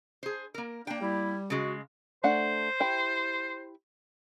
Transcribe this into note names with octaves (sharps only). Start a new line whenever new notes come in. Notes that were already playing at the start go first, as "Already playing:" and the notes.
G#4 C5
A#3 A#4
A#3 D4 G5
G3 E4
C#3 G#3 F#4
A3 D4 C5 F#5
E4 G4 G5